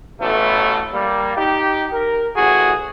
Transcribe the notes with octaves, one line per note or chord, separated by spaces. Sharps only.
A1 B2 A3
G3 A#3
D#4 G4
A#4
A1 F#4 G#4